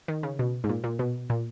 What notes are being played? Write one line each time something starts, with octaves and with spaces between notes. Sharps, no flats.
D#3
C#3
B2
G#2
A#2
A#2
B2
A#2